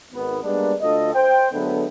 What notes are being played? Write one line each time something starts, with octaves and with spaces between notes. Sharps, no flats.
G#1 D#3 B3
G3 G#3 A#3 B3 D4
D2 D3 F4 A4 D#5
C5 G5
D3 F#3 G#3 A3 B3